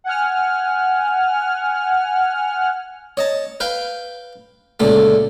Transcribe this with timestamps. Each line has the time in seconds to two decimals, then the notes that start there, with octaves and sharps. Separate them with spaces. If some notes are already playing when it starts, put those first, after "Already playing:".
0.04 F#5 G#5 F6
3.17 C#5 D#5 A5
3.60 B4 F5 G5
4.80 C#2 A#2 D3 A3